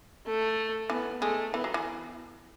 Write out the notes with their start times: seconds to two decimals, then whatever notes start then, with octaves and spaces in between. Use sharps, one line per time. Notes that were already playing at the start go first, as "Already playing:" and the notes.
0.26 A3
0.90 E3 B3
1.22 G#3 A3
1.53 E3 B3
1.64 F#3
1.74 E3